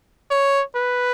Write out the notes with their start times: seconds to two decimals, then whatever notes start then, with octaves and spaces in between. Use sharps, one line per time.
0.31 C#5
0.75 B4